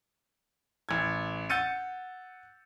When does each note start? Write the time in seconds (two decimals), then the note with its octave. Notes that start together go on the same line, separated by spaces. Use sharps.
0.89 A1 G#6
1.50 F#5 E6 G6 A6 C#7 D#7